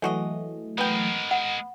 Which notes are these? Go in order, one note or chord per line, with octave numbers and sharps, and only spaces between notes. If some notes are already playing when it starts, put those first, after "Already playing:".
E3 F#3 G#3 A3 F#4 D#5
G#3 B3 A#4 G5
F#5